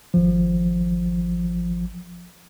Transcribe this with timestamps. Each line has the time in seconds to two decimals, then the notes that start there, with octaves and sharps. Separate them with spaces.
0.14 G#1 F3